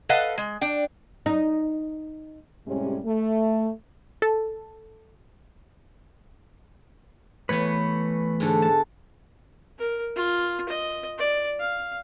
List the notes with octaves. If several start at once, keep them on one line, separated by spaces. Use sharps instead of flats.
A4 B4 D#5 F5 F#5 A5
G#3
D4 G5
D#4
A2 C3 G3 G#3 C#4
A3
A4
E3 A3 B3 B4 C#5
G#2 D3 A4
A5
A#4
F4
D#5
D5
F5